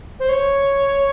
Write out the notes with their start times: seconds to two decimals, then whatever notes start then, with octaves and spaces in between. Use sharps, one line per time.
0.20 C5
0.29 C#5